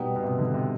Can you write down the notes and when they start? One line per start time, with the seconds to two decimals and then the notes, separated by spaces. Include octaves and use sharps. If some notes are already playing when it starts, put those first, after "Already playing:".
Already playing: B2 G3 B3 D#4
0.16 B2
0.24 C3
0.39 D3
0.54 C3